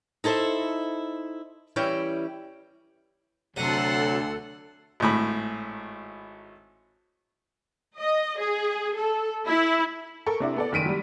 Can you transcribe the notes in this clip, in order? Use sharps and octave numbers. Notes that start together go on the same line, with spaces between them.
D#4 E4 A4 C5 E5
E3 G3 C#4 E4 G5
D2 C3 F#3 A4 F#5 C6
G#1 A2 B5
D#5
G#4
A4
E4
A4 A#4 C#6
C3 D4 E4
B3 A4 D5
F#1 D#3 B6 D7 D#7
F#3 G3